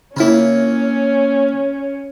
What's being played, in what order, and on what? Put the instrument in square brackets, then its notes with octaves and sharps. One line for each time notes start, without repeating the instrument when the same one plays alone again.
[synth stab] C#3 E4 [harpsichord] A#3 C4 F4 [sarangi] C#4 [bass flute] C#5